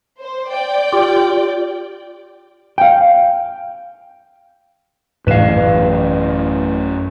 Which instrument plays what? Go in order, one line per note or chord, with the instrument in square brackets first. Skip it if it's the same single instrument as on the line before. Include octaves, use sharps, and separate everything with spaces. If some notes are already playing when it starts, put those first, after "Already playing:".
[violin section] C5
D5 G5
[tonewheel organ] F4 G4
[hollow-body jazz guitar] F5 G5
[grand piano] A1 E7 [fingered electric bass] F#2 A3 [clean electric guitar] B4 F5